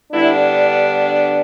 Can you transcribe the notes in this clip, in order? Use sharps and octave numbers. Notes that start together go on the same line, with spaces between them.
D3 G3 B3 D4 E4